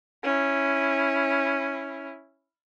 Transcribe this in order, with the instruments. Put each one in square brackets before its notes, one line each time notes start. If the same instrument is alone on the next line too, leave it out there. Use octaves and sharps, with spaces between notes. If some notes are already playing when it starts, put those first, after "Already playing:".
[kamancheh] C#4 E4